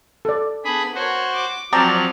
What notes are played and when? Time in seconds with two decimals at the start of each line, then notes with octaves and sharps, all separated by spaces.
0.25 A4 D5
0.64 B3 D4 G#4 B5
0.95 F#4 A#4 C5 C#5
1.34 D6
1.73 F3 F#3 C4 D5 G5 A5 A#5 F6